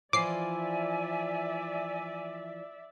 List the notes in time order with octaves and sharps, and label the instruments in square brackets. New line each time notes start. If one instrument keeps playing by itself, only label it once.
[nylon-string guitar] E3 F3 [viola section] D5 E5 [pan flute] G#5 [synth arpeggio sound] D6 C7